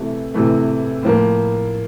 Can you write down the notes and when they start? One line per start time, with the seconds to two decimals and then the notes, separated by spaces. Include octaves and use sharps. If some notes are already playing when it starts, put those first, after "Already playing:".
Already playing: C3 E3 A3
0.34 C3 E3 A3
1.03 A2 F3 A#3